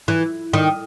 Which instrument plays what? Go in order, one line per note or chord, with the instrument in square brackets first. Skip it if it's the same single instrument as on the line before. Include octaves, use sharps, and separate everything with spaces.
[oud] E3
D#3